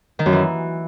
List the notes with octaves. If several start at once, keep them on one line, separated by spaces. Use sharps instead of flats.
D#3
F#2
E3